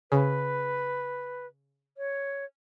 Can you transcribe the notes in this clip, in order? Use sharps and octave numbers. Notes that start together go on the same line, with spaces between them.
C#3 B4
C#5